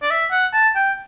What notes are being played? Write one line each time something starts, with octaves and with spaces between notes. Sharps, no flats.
D5
E5
F#5
A5
G5